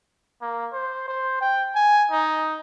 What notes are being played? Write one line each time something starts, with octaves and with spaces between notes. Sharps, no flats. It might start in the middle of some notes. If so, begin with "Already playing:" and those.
A#3
C5
C5
G5
G#5
D#4